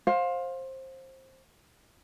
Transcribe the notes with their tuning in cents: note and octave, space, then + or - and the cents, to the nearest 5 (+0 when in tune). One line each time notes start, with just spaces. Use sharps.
C5 +20 F5 +20